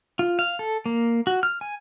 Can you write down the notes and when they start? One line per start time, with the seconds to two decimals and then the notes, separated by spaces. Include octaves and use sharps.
0.19 F4
0.39 F5
0.59 A4
0.86 A#3
1.27 F#4
1.43 F6
1.61 G#5